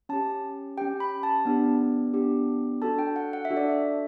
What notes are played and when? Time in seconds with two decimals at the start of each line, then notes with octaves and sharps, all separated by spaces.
0.09 C#4 G4 A5
0.78 C#4 G4 G5
1.00 B5
1.23 A5
1.45 B3 D4 G4
2.14 B3 D4 G4
2.82 D4 F#4 A4 A5
2.99 G5
3.16 F#5
3.33 F#5
3.45 E5
3.50 D4 F#4 A4
3.57 D5
3.69 E5